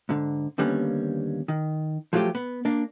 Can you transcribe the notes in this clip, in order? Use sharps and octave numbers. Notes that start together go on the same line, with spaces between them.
G#2 D3
D#2 D3 G3 A#3 B3 C#4
D#3
F3 F#3 A3 F4 G4
B3
A#3 D4